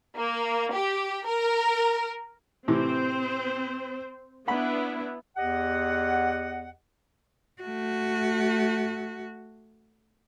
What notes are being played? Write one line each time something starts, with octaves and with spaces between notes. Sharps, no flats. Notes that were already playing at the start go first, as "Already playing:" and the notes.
A#3
G4
A#4
A2 C3 E3 C4 C5
B3 D4 E4 F#5 B5
E2 G4 D#5 F#5
A3 F#4